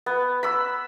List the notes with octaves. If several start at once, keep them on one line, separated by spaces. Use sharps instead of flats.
B3
B5 E6